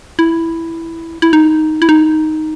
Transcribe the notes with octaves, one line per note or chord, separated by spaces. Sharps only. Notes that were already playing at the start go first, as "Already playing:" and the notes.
E4
E4
D#4
E4
D#4